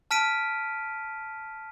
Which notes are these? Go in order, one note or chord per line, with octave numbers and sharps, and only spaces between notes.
A5 F6 B6 D7 D#7